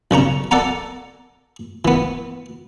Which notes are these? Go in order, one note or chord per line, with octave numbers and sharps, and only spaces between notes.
B1 C#3 C#5 A#5
A4 D5 F#5 G#5 A#5
E3 B3